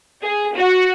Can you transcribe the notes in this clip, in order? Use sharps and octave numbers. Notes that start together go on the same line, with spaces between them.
G#4
F#4